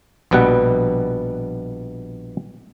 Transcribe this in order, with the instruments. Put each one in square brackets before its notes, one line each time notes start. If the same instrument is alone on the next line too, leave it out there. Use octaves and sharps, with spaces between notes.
[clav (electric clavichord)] A#1 B2 G3 B4 F#5